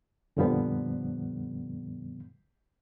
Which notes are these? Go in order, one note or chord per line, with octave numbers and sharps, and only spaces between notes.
F2 A#2 D3 F3 G3 B3